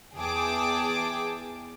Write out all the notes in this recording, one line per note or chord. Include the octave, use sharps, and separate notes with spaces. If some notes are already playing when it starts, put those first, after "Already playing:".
E2 G#4 G5 A5 D6